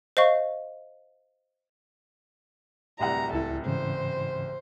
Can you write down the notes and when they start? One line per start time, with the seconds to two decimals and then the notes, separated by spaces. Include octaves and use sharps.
0.17 C5 D#5 F5 C#6
2.99 D1 C2 F#5 A#5
3.33 C#2 E4 A4
3.66 G#2 C#3 E3 C5